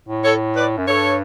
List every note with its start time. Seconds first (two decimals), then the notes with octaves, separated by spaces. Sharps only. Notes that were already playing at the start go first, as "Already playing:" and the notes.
0.09 A2
0.24 A4 C#5
0.56 B4 D5
0.78 F#2
0.87 G2 A4 C#5